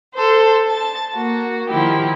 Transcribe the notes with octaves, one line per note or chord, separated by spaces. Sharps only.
A4 C5
A5 A6
A#3 F#4
D#3 F3 E4 G4